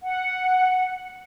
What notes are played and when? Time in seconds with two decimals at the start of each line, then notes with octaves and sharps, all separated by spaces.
0.02 F#5